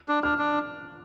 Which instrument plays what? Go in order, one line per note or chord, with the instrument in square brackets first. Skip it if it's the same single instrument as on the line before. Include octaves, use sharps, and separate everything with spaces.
[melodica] D4
[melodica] D4 [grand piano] F6
[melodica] D4